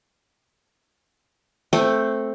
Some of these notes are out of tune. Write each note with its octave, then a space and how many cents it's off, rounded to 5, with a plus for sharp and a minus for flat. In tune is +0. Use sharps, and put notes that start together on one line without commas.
A3 +0 C4 +5